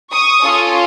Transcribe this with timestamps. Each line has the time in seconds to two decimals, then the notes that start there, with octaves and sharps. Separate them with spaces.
0.13 C#6 D#6
0.41 C#4 F4 A4